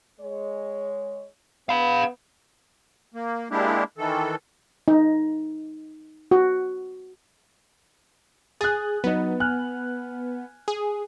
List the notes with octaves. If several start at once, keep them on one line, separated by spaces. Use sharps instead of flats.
G#3 C#5
B3 F5 B5
A#3
G#3 A#3 D4 E4 G4
D#3 E3 A4
D#4
F#4
G#4 F#6 A6
F#3 B3 D#4 D#5
G#5 F6 F#6
G#4